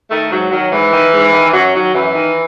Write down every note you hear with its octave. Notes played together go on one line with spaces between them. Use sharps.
D#3 A3
G#2 F#3
D#3 F#3
G#2 E3
D#3
G#2
D#3
F#2 F#3
D#3 F#3
F#2 E3
D#3